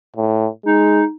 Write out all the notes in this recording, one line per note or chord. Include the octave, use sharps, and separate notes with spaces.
A2
G#3 D#4